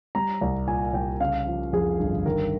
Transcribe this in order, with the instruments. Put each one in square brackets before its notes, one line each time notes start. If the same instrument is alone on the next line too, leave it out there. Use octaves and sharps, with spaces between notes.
[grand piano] G3 A#5
C2
A#2 G#5
C2 G5
C#3 F5
F3
F2 G#4
G1
D#3 A#4